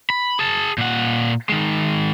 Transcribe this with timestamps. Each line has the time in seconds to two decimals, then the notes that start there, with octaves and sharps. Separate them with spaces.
0.10 B5
0.39 G#4 A5
0.78 A#2 F#5
1.49 D#3 G#3